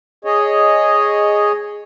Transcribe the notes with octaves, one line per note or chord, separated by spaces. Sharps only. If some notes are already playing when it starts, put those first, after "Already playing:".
G#4 C#5 D#5